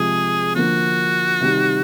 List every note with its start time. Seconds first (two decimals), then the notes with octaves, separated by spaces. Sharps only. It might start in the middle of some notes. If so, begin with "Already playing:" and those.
Already playing: C3 F3 G#3 G#4
0.55 D3 F3 A#3 F#4
1.40 C3 D#3 G3